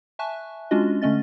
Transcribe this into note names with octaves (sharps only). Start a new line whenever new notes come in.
E5 G#5 A5 C#6 F#6
G#3 C#4 D4 F4 F#4 D#5
D3 A3 C#4 D#5 A6